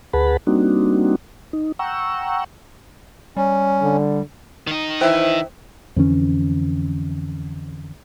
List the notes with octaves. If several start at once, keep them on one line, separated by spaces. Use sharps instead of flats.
D2 G#4 B4 F#5 A5 B5
G3 A#3 C4 D4 D#4 F#4
D#4
F#5 G5 A#5 C#6 E6
G3 C#4
D3
D#3 D#4
E3 C5 E5 G5
F2 D3 E3 C#4